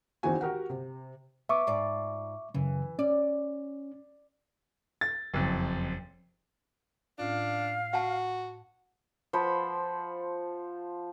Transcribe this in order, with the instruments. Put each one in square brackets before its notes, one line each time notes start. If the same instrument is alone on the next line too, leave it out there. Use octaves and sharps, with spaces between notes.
[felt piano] E2 D#3 C4 E4 F#4 G#5
F#4 G4 A#4 F#5
C3
[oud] B3 [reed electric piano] E5 C#6 D6
[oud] G#2 F4 D5
[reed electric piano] F#2 C#3 [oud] E3
[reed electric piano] C#4 [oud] D5
[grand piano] A6
F#1 F2
[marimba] A2 C#4 F4 [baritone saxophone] D4 [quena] F5
[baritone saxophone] F#4 [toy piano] F#5 A5
[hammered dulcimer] F3 C5 F#5 B5